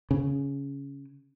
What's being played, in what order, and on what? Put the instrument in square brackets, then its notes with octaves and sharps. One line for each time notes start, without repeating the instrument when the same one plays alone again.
[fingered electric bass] C#3